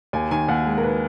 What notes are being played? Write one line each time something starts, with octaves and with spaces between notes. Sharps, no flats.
D#2 G#5
D#3 G#5
D#2 F#5
G#3
A#4
B4